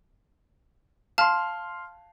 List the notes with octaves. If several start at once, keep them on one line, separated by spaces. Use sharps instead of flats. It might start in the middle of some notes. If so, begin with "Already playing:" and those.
F5 A5 C6 F6